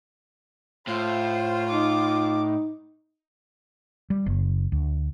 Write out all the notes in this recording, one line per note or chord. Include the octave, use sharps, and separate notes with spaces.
A2 F4 C5
D#4 D6
G3
F#1
D2